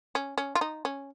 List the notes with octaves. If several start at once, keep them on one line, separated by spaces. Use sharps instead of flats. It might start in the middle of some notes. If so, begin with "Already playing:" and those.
C#4
C#4
F4
D#4
C#4